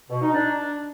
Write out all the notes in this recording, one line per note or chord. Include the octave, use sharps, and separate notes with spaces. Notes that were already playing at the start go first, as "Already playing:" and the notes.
B2
D#4
D4